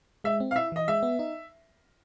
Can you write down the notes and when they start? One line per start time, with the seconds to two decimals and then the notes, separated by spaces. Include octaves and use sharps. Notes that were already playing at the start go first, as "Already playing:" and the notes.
0.24 G#3 E5
0.40 C4
0.51 F5
0.56 E4 E5
0.72 E3 D#5
0.88 G#3 E5
1.03 B3
1.19 D#4